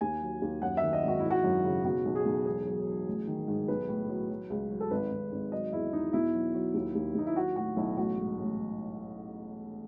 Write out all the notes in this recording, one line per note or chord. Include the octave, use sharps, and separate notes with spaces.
D#2 G#5
F#3
D#2
F#2 F#5
E5
D#3
D#5
G#1
F#4
G#1 E4
F#4
F#2
C#3
B2 F#4
B1
G#4
B1
E1 G#4
F#3
F#3
A1
D#3
G#2
B1 B4
A2
F#3
F#3
C#2
F#3
A4
G#1 B4
G#1
G#1
F#3 D#5
E2 E4
E2 D#4
B2 E4
F#3
F#3
D#2
D#2
D#2 D#4
E4
F#3 F#4
A2 F#4
B1 E4
A1 F#4
G#2
A1